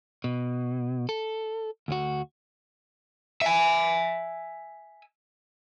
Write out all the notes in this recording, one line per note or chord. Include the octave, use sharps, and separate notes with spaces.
B2
A4
D2 F#4
E5 G#5